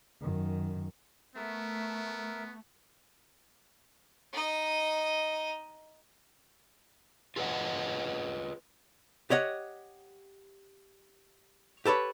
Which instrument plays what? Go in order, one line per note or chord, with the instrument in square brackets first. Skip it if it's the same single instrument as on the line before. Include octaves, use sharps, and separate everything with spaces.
[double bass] F#2 D#3
[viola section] A3 [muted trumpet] B3 [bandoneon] A#4 E5
[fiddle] D#4 D#5
[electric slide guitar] F4 G#4 B4 D#5 F#5
[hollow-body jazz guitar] G4 C#5 D#5 F#5
G4 A4 B4 C#5